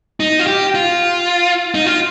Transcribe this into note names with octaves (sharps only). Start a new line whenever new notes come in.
D#4
F4
G4
F4
D#4
F4